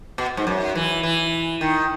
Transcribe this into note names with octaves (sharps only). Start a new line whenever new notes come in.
B2
G#2
F#2
E3
E3
D#3